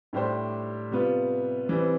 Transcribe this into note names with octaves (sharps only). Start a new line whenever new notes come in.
A2 G3 D4 G4 C5
C3 G3 B3 F4
E3 G3 C4